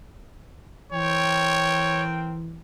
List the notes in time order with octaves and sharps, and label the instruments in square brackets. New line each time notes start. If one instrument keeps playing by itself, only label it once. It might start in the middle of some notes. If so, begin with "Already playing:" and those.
[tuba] E3 [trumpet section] C4 A#4 G5 [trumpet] C#5